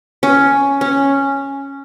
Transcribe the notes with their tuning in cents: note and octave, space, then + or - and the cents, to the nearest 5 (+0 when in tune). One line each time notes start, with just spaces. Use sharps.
C#4 +5
C#4 -5